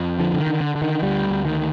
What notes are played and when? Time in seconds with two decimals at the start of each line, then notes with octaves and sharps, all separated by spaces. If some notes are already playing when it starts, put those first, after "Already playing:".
Already playing: F2
0.19 D3 F3
0.34 D3
0.40 D#3
0.47 D3
0.61 D3
0.75 D3
0.82 D#3
1.02 D2 G3
1.30 D2
1.45 D#3